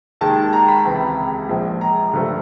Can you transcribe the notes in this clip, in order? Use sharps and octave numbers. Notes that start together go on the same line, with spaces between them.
D#2 D#3 G#3 A5
A#5
B5
C#2 C3 E3 A#5
A#1 A#2 F3 G#3
A#5
G2 D3 F3 A3